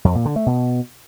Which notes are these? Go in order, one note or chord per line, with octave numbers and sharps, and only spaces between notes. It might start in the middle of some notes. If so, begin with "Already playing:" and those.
F2
A#2
D3
A3
B2